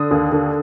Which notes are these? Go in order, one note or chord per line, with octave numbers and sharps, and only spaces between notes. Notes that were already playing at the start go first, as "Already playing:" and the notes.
Already playing: D3 D#6
D#2
D3